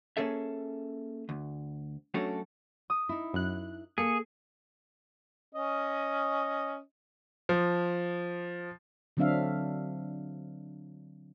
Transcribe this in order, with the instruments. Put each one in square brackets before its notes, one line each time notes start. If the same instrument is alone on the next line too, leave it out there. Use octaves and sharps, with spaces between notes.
[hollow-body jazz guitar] A#3 C#4 G#4 A4 E5
D2
F#3 A3 C#4 D4 F#4 A4
[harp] D#6
[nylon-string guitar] D#4 E4
[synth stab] F#2 F#6
[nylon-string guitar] A#3 A4 [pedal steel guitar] G#4 [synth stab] C#7
[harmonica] C#4 D#5
[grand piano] F3
[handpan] D3 F#3 C4 D4 E5 F5